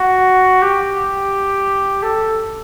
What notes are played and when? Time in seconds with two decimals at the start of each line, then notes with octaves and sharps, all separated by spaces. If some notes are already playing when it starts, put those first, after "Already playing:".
Already playing: F#4
0.62 G4
2.03 A4